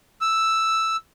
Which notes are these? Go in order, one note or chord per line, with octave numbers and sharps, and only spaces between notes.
E6